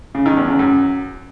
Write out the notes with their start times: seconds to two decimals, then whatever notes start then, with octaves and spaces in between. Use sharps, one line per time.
0.15 C#3
0.26 D#3
0.37 E2
0.48 C#3
0.59 F#2